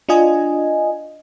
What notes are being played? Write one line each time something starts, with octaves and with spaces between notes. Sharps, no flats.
D4 F4 D#5 G#5